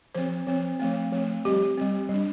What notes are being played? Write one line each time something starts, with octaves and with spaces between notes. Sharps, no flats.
F3 C4 C5
F3 C4
F3 A3 C4
F3 A3 C4
G3 C4 G4
G3 C4
G3 D4